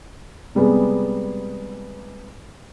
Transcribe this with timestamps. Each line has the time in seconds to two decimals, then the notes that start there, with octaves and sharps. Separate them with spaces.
0.55 C3 G3 G#3 B3 G#4